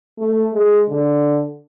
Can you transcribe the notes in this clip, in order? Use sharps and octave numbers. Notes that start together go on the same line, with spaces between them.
A3
G#3
D3